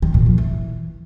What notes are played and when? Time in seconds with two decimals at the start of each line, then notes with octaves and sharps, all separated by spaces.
0.02 D#3
0.14 A#2
0.26 F3
0.38 E3